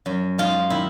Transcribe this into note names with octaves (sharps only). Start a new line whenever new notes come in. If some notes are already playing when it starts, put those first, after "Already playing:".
F#2
G#3 F4
D#3 E4